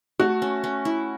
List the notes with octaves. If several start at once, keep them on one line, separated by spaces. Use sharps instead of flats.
A3 F#4
C#4
C#4
E4